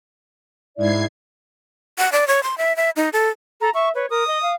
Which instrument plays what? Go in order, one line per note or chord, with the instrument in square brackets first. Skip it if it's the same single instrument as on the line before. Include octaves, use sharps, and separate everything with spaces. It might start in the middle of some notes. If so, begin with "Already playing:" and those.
[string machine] G#2 G#6 C7 [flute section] E4 D5 E5
[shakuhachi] F#5
D5
C#5
C6
E5
E5
D#4
A4
[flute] A4 [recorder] A#5
[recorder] E5 [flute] C#6
[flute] B4 [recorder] C#5
[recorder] A#4 [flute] D#6
[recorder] D#5
F5